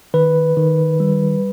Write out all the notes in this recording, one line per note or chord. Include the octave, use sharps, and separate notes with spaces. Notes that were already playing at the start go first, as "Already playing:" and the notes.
D#3 B4
D#3
G3